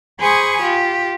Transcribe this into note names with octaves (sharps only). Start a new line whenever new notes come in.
G#4 C5 G#5 B5 C#6 D#6
F4 G4